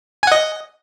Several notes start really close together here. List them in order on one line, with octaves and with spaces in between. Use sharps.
G#5 F#5 D#5